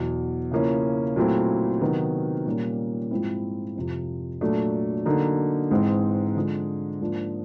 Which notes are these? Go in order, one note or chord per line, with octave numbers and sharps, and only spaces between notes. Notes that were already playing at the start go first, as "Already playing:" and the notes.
Already playing: E2 B2 F#3
C#3 F3 A#3 C#4 E4
A#2 F#3 A3 C4 E4
C3 D#3 F#3 B3
A#2 G3 A#3 C#4
G#2 F3 G#3 C4 E4
F2 C3 F3
A#2 F#3 A3 D4
D3 F#3 A#3 D#4
G#2 E3 G#3 C4
D3 F3 G#3
G#2 F3 A#3 D4